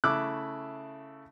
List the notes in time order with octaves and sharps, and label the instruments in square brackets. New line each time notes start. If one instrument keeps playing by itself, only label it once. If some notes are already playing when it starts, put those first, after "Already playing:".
[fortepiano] C#3 A3 E4 D6 E6 F#6